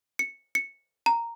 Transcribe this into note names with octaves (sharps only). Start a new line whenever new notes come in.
C#7
C#7
A#5